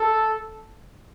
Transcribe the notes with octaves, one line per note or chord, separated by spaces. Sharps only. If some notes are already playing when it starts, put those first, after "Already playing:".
Already playing: A4